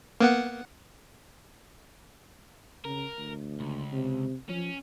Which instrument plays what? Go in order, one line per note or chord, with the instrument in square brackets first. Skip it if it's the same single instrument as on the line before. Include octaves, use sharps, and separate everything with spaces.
[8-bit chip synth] A#3 B3 F#5
[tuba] C#3 [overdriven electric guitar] A#4
[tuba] D2
[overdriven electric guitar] C#2
[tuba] C3
[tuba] F3 [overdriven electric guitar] C#4